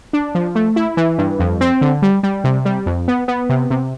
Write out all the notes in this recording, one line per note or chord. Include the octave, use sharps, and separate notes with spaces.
D4
F3
A3
E4
E3
G2
F2
C4
D3
G3
G3
C3
G3
F2
B3
B3
C3
C3